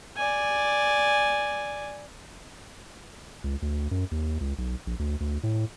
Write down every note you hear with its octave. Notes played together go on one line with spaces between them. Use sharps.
D5 G#5
C#2
D2
F#2
D#2
C#2
B1
A#1
D2
D2
A2